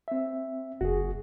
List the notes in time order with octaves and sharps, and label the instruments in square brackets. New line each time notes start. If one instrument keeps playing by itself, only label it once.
[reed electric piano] C4 E5
[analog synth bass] F#1 [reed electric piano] F#4 G#4